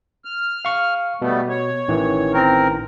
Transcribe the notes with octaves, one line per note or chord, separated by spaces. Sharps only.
F6
F5 C#6
B2 G3 A3 B3
C#5
A1 D#3 E3
C4 A#4